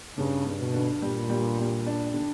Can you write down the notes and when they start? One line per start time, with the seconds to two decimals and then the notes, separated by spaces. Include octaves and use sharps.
0.17 G2 C#3
0.46 G2
0.60 B2
0.74 D3
1.02 A#2 G3
1.29 G3
1.59 G3
1.86 D4
2.14 D3